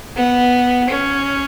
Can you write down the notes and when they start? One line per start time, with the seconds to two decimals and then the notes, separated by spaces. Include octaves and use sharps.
0.16 B3
0.89 C#4